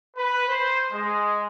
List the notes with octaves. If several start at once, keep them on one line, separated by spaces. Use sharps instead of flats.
B4
C5
G#3